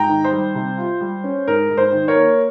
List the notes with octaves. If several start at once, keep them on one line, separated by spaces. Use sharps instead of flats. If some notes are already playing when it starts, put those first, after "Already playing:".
Already playing: G#2 G5 A#5
D#3
C5
G3
C3
F4
G3
C#4
G#2 A#4
G#2
C5
D#3
A#4 C#5
A#3